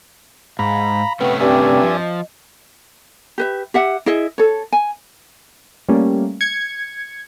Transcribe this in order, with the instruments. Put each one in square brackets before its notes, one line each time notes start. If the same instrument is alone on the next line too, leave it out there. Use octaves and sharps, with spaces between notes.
[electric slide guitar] G#2 [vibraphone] F5 [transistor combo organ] A#5 B5
[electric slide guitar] C3 A3 C#4 [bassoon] B3 [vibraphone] G5
[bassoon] G2 [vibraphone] C4 G5 D6 [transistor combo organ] D5 E5 G#5
[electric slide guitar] F3
[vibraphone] D#5
[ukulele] G4 B4 E5
G4 E5 F#5
E4 G#4 D#5 E5
A4 C#5
G#5
[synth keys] G3 A3 A#3 C#4
G#6 C#7